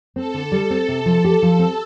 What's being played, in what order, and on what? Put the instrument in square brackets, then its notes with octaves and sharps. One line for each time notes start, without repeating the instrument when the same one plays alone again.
[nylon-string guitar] C4 [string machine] A4
[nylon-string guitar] D3
G3
C4
C3
F3
G4
F3
C4